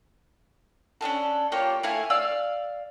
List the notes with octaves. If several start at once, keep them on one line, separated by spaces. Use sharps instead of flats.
C#4 D4 F4 A4
A#3 F4 G4 C#5
A3 E4 F5 G#5
D5 F5 E6